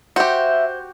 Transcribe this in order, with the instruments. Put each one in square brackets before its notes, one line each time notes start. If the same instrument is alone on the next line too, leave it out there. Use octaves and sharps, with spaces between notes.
[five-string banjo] F#4 G4 [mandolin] C5 [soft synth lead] E5